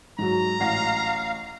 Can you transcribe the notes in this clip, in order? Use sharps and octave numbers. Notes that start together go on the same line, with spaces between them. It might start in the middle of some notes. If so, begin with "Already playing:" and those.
G#2 F#3 A#5
A1 F5 F#5 A#6